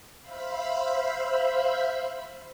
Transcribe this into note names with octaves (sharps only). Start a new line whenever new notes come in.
C5 E5 F5 B5